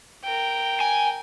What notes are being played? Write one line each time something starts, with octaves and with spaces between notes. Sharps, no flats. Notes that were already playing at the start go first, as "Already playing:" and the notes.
A#4 G5
G#5